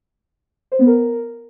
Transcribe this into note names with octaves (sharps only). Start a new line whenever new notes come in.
C5
B3
A#4